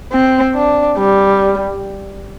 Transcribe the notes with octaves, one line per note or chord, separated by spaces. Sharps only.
C4
D4
G3